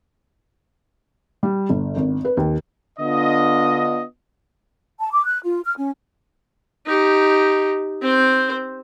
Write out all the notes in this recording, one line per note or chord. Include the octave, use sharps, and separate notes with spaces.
G3
G1
G#1
B4
D#2
D3 B3 D4 F4 D#5
A5
D6
F#6
F4
F6
C#4
D#4 G4
C4 C5